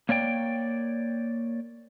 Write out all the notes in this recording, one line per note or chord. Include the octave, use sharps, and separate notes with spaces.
A#3 C#5 D5 G5